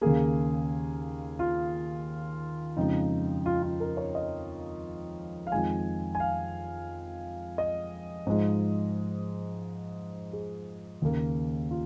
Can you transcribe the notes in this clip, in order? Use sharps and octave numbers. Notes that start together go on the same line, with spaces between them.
D#2 C#3 A#3 G#4
F4
F2 C#3 G#3 D#4
F4
F4
A#4
C#5
D#5
F5
F2 D#3 G#3 G#5
G#5
F5
D#5
G#2 F3 G#3
G#4
D#2 C#3 A#3
F4